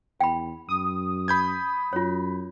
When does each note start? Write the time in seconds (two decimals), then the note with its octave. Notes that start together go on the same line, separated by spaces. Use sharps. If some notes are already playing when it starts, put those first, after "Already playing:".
0.20 E2 G5 B5
0.69 F#2 D#6
1.28 B5 G6 G#6
1.93 F#2 F4 C#5